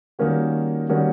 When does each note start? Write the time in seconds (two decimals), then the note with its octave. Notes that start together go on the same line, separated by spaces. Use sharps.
0.19 D#3 G3 A#3 C#4 F#4
0.89 D#3 G3 A#3 C#4 F#4